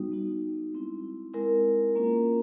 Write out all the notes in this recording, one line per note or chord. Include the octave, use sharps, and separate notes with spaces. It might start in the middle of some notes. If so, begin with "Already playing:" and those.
Already playing: G3 B3 D#4 F#4
G3 B3 D#4 F#4
G#3 C4 E4
G#3 C4 E4 A#4
A#3 C#4 F4